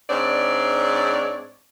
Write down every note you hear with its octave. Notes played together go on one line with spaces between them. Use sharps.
G#2 C4 D4 C#5 D5